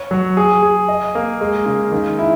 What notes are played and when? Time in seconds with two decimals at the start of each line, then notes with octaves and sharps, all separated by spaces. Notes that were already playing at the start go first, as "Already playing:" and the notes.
Already playing: C#5
0.11 F#3
0.37 G#4
0.63 G#4
0.88 D#5
1.15 A#3
1.41 G#3
1.66 C#3
1.92 D#3
2.19 E4